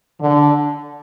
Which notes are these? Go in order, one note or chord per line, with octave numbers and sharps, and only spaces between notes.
D3